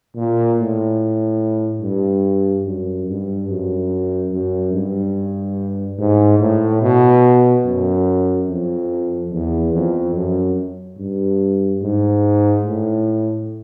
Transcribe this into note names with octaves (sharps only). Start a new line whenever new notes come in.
A#2
A2
G2
F#2
G2
F#2
F#2
G2
G#2
A2
B2
F#2
F2
E2
F2
F#2
G2
G#2
A2